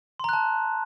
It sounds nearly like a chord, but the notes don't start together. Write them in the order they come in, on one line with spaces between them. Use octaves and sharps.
C6 A#5 F#6 A5